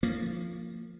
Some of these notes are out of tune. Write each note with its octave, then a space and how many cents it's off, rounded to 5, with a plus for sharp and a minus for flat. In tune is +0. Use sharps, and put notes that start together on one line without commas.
F3 +0 A#3 -30